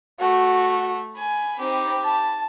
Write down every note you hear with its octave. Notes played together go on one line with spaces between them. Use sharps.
A3 F#4
G#5 B5
C4 D#4 G4
A5